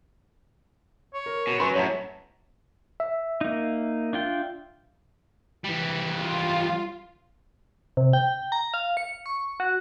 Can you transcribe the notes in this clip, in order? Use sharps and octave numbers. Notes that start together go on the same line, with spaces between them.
C#5
A#4
B2
F#3 C#4 B4 B5 C6
F#2 A2 C#5 A5 A#5
E5
A#3 D#4
D4 F4 G5
E3 G3
F4
C3
G5
A#5
F5
C#7
C#6
F#4